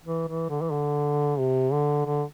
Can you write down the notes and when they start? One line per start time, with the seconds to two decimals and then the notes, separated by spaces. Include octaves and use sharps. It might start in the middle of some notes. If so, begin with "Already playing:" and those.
0.05 E3
0.28 E3
0.50 D3
0.62 E3
0.72 D3
1.39 C3
1.73 D3
2.06 D3